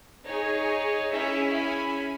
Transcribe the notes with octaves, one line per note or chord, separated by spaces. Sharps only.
D#4 G#4 C#5
C#4 E4 G#4 C#5 E5
G#5 B5